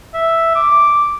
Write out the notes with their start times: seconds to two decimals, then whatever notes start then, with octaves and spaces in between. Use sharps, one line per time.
0.14 E5
0.55 D6